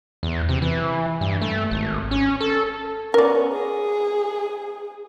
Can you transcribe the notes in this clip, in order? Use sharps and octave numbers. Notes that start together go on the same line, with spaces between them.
E2
C3
E3
G2
A3
G#1
C#4
A4
B3 C#4 A#4 D5
G#4